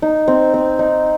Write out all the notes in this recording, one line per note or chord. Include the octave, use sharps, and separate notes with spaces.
D#4
C4
C4
D#4